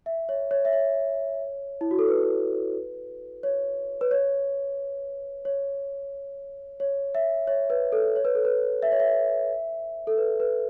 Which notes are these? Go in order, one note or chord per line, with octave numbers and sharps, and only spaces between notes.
E5
C#5
C#5
E5
C#5
E4
F#4
A4
B4
C#5
B4
C#5
C#5
C#5
E5
C#5
B4
A4
C#5
B4
A4
B4
E5
C#5
E5
A4
B4
B4